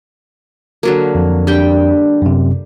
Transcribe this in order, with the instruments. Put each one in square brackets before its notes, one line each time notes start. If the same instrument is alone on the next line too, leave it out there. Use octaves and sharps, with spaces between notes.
[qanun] D3 F#3 A#3
[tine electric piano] F2
[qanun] G3 G5 [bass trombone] D4
[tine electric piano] F#2 C3